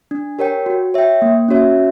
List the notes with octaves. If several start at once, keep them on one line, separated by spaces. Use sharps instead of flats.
D4
G4 A#4 C#5 G5
F#4
C#5 E5 G5
A#3
C#4 F#4 C#5 E5